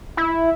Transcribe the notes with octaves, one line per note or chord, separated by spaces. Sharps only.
E4